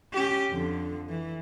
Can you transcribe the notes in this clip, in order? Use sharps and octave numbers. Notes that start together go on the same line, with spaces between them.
C#4 G4
F2 D3
E3